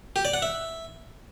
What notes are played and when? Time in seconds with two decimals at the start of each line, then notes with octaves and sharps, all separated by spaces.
0.16 G4
0.25 D5
0.33 F#5
0.42 E5